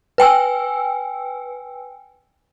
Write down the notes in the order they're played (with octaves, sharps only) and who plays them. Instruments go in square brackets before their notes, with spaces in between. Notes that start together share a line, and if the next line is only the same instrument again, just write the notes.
[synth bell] B4 G5 G#5 E6